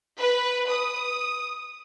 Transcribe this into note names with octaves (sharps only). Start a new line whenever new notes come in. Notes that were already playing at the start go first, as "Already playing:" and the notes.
B4
D#6